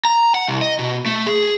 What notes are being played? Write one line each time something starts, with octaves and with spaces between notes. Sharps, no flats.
A#5
F#5
C2
D#5
B2
A3
G#4